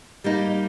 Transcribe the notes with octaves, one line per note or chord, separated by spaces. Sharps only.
G3 A#3 D#4